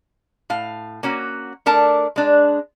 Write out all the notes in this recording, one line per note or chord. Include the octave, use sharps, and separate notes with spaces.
A2 F5
A#3 C#4 F#4
A3 D4 A#4 A5
G#3 D4